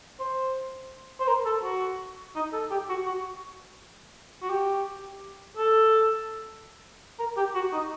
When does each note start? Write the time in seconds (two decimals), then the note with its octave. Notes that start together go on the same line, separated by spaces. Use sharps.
0.19 C5
1.20 C5
1.27 A#4
1.45 A4
1.63 F#4
2.35 D#4
2.53 A4
2.71 G4
2.89 F#4
3.06 F#4
4.42 F#4
4.50 G4
5.57 A4
7.19 A#4
7.37 G4
7.54 F#4
7.73 D#4